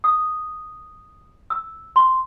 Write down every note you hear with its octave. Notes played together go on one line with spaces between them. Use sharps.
D#6
E6
C6